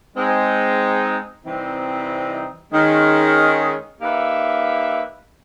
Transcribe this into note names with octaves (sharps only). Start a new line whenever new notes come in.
G#3 C4 D#4
C3 E3 G3 C4 D#4
D#3 G#3 C#4
A#3 D#4 G4 B4 E5